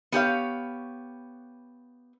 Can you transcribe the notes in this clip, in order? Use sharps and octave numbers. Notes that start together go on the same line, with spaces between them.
B3 G4 C#5 F5